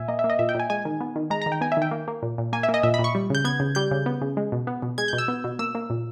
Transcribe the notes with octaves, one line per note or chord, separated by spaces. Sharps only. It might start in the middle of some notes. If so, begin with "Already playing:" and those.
Already playing: A#2 E5 G#5
A#3 D#5
E5
A#3
D#5
A#2 E5
G5
A#2 G#5
G#3 G#5
D#3
B3
D#3
G#3 A#5
A#5
D#3
G5
B3 G#5
E5
D#3 G5
A#3
A#3
A#2
A#2
A#3 G#5
E5
A#3
D#5
A#2 E5
B5
A#2
C#6
G3
C#3 G6
B3 G#6
C#3
G3 G6
C#3
B3
C#3
G#3
B2
B3
B2
G#3 G#6
G6
B2
E6
B3
B2
A#3 E6
A#3
A#2